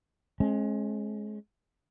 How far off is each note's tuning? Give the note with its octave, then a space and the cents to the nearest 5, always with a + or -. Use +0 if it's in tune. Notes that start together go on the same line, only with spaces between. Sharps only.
G#3 +25 C#4 -40